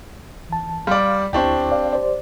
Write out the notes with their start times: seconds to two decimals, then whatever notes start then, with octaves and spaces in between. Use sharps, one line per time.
0.49 E3 A5
0.87 G3 D5 F5 C6 F6
1.33 D2 C4 D4 E4 G4 C#6
1.72 D5 F5
1.93 G4 C5 D5